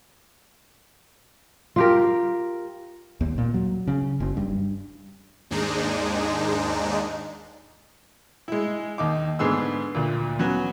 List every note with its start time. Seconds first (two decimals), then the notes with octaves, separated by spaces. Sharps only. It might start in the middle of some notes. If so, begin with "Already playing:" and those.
1.76 F4 G4 A#4
3.21 D#2
3.38 A#2
3.54 F#3
3.87 C#3
4.20 F#1
4.37 G2
5.50 D#2 G#2 G#3 D4 D#4
8.48 G#3 E4
8.98 D#2 D#4 D6
9.39 G#2 D3 B3 D4 G#4 E6
9.95 D2 A#2
10.39 F#3 B3 C#4 F#4